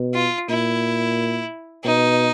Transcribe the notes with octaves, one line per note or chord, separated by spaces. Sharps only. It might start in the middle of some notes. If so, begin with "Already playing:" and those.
Already playing: B2
F4
A#2 E4
B2 D#4